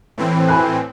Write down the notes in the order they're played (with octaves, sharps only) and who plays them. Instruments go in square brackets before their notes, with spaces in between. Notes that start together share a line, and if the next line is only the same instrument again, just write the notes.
[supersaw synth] A2 E3 C4
[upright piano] G#5 B5 F#6